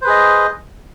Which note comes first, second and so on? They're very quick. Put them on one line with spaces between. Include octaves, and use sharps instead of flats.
C5 B4 G#4 D#5